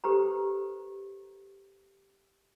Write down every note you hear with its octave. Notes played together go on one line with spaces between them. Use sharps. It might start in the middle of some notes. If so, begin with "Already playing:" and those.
G4 A4 B4 C5 A#5